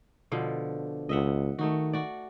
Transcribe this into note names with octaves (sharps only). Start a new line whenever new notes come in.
B2 D3 F3
C#2 D#5 E5 F#5
D#3 A3 D#4 F#4
F#4 D5